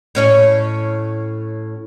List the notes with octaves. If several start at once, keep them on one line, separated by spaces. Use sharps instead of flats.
A2 C#4 C#5